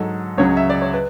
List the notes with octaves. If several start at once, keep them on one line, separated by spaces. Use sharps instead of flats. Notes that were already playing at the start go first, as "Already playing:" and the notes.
Already playing: G#2 F#3 A4
C#2 C#3 F#3 C#5
E5
D5
C#5
B4